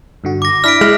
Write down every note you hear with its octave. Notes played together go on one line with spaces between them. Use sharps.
G2 D3 F#4
D6 A#6
D4 E4 B5 F6 B6 D7
G#3 E4 F6